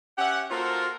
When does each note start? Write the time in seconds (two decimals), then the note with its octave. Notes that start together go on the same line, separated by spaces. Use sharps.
0.18 C#4 G4 E5 F#5
0.51 A#3 F4 F#4 A4 A#4 C5